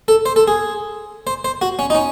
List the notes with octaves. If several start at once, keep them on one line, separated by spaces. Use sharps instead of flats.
A4
C5
A4
G#4
C5
C5
F#4
C#4
D#4
C#4